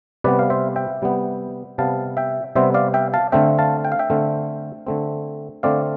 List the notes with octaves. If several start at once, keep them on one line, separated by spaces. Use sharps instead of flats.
C3 G3 B3 B4 D5
F5
C5 E5
E5 G5
C3 G3 B3
C3 G3 B3 F5 A5
E5 G5
C3 G3 B3 C5 E5
D5 F5
E5 G5
F5 A5
D3 A3 C4 E5 G5
F5 A5
G5
F5
E5 G5
D3 A3 C4
D3 A3 C4
D3 A3 C4 D5 F5